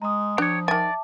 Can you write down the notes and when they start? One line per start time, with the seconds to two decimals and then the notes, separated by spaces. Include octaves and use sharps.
0.02 G#3 A#5 D#6
0.38 F3 D4 G4 C#5
0.68 D#3 D5 E5 G#5 A5 D6